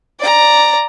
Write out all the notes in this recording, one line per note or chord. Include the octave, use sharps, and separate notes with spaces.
D5 A#5